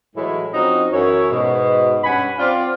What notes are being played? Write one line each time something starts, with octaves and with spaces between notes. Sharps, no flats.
A2 E3 F#3 G#3 E4
F3 C4 C#4 D#4 F#4 D#5
F#2 E3 E4 C#5
G#2 B2
G2 C#4 F#5 G#5 B5
C4 F4 D5